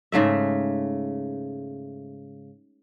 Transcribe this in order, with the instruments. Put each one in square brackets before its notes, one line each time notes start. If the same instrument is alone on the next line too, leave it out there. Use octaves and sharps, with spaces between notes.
[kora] G#2 C#3 A3 E5